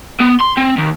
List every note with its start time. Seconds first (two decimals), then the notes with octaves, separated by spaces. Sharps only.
0.21 B3
0.41 C6
0.57 C4
0.79 D#2